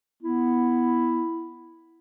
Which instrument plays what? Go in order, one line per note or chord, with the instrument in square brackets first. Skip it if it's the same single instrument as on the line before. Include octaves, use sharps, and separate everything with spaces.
[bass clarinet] B3 [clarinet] E4